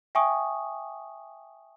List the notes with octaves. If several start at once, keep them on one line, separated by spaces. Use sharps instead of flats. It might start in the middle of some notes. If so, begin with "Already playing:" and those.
E5 G5 G#5 C#6 D#6